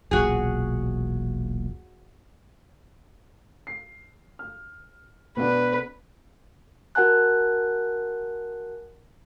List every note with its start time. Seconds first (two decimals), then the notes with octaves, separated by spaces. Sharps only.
0.11 E1 B1 A#2 F#4 G#4
3.67 C7
4.39 F6
5.37 B2 B3 D4 B4
6.95 F#4 A#4 F#5 G#5 A5 F#6